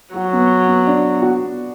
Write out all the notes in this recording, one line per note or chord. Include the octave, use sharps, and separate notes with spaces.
F#3 F#4
B3
B3
D4
F#4